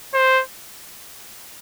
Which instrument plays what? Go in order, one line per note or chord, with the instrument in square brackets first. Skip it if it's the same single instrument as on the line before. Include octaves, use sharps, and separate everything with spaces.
[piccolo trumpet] C5